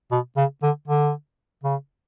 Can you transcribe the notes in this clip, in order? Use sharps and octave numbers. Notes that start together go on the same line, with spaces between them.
B2
C#3
D3
D3
C#3